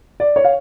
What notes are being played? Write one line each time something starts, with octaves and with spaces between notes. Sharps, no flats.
D5
C#5
F5